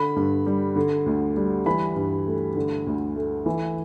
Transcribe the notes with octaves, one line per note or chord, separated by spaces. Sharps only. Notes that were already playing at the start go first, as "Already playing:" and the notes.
Already playing: D3 B5
G2
G3
D3
D2
G3
E3 B5
G2
A3
D3
D2
A3
E3